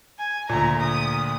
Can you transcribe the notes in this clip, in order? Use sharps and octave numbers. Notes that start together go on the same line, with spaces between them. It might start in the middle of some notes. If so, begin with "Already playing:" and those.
G#5
D2 A#2 A#5
D#6